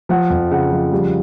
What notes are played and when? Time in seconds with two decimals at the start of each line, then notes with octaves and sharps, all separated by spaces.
0.09 F3 F#5
0.30 F2
0.51 C#3 F#5
0.72 F3
0.92 G3